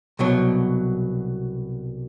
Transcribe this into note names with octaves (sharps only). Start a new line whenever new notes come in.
C2 B2 F#3